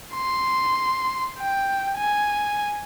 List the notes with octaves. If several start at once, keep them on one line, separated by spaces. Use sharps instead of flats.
C6
G5
G#5